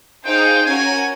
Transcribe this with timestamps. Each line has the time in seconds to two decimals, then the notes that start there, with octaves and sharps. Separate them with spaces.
0.25 D#4 G#4 C5 F5 G5
0.65 C#4 F#4 A#4 G#5